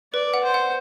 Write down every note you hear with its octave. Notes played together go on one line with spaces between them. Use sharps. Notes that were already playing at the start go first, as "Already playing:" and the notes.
B4 D5
F#5
C5
F#5